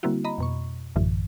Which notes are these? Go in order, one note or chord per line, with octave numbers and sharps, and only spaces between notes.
D3 G3 A#3 C4 E4 F#4
D#5 A#5 B5
F2 B2 C#6
A1 F#2 A2 D3 E3